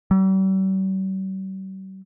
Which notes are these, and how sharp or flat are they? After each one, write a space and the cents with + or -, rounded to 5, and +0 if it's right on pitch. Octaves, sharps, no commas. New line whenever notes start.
G3 -45